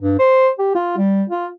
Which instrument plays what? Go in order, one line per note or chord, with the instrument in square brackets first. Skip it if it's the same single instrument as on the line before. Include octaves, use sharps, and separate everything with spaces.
[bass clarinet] G2
C5
G4
F4
G3
F4